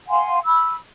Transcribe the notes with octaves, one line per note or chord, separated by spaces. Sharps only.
F5 F#5 G#5 C6
B5 E6